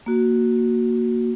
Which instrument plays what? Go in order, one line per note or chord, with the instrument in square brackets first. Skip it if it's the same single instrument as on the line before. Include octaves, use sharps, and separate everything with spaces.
[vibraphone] A#3 F#4